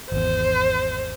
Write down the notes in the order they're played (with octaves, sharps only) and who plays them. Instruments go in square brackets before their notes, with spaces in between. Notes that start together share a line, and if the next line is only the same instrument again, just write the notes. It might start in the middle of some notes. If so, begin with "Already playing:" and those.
[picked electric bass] G#1 E2 [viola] C5